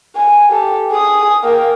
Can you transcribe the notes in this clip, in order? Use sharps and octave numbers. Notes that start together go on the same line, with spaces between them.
G#5
G4 A4
G#4 D#6
A#3 G5